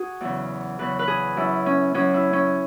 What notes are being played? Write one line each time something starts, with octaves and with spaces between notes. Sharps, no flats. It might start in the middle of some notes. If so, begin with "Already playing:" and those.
Already playing: F#4 G#4
E2 C#3 F#3
E2 C#3 F#3 B4
B4
G#4
F#2 F#3 E4
C#4
F#2 F#3 C#4
E4
C#4